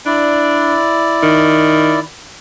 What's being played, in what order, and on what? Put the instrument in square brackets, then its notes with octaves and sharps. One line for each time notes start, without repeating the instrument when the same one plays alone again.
[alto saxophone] D4 [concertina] E4 D5
[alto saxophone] D#3